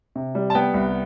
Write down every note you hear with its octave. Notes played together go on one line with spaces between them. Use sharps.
C3
G3
A5
B3 G5
C2